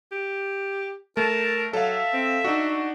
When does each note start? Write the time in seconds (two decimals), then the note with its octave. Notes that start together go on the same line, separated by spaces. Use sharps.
0.12 G4
1.17 A3 A#4 A5
1.73 F#3 A4 E5 F5
2.14 C4
2.44 D4 D#4 F#4